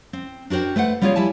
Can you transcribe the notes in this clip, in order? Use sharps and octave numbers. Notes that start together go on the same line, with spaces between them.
C4
D4 F#4 A#4 C5 G5
A3 B4 C5 F#5
G3 A#3 F4 G#4 C5 C#5
G3 E4 G#5 A5